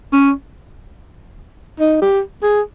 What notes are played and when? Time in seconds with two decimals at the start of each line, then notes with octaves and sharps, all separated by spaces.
0.13 C#4
1.80 D#4
2.01 G4
2.43 G#4